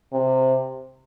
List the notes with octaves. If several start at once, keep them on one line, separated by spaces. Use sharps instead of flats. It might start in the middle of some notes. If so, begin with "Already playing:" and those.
C3